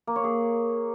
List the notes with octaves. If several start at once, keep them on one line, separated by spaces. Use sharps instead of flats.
A#3
C#5
G#4